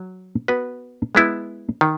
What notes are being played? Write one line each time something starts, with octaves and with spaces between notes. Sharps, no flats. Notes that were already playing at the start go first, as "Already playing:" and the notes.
Already playing: F#3
B3 F#4 B4
G#3 B3 E4
D#3